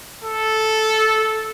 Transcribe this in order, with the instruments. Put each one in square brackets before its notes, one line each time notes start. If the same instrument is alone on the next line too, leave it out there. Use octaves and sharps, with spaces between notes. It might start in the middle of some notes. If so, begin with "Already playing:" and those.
[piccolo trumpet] A4